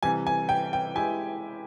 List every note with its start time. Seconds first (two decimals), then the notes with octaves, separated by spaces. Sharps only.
0.03 C3 E3 G3 G#5
0.27 G#5
0.49 G5
0.73 G5
0.95 G#3 E4 G4 G#5